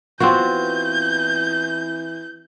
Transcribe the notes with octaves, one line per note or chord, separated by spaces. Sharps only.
E3 B3 C4 F4 F#4 B4 G6